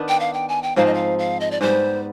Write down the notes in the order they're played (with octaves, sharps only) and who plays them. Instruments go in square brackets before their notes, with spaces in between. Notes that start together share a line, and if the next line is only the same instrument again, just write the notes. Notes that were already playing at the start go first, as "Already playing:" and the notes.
Already playing: [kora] D#3 B3 D4
[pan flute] G5
F5
G5
G#5
G5
[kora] G#2 F3 C4 D#4 [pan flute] F5
[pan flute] D#5
F5
F5
D#5
D5
[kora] G#2 G3 B3 [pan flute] C5